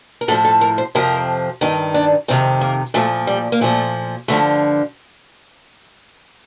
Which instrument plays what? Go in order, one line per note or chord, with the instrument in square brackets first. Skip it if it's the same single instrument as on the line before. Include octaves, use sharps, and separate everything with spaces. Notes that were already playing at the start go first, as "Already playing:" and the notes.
[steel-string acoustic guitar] A#4
A2 A4
F3
A4
A#4
C5
F2 C3 F3 A#4
G2 D#3 D#4
D4
F2 C3 D#3 C4
A#3
A#2 F3 A3
G3
A#3
A#2 F3 A3
G2 D3 F3 A3